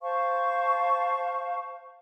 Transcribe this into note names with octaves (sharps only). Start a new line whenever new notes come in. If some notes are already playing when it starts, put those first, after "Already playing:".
C5 F5 A5 C#6